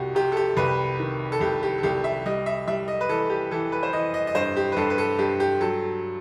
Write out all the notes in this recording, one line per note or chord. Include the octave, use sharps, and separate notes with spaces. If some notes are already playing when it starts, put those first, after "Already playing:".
Already playing: C2 C3 F#4 G4
C3 G4
A4
G4
C2 B4
D#3
A4
C2 G4
G4
A4
C2 G4
E5
G3 D#5
E5
G3 E5
D#5
B4
E3 A4
G4
E3 A4
B4
C5
E3 D#5
D#5
D#5
G2 C5
G4
B4
G2 A4
B4
A4
G2 G4
G4
F#3 A4